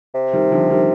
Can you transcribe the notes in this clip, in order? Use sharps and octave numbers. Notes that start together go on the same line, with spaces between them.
C3
D#3 G3
D3 F3
D#3 G3